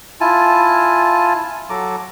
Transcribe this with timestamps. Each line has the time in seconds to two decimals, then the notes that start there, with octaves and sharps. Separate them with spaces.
0.21 E4 F4 G#5 A5
1.70 F#3 A4 A#5 D6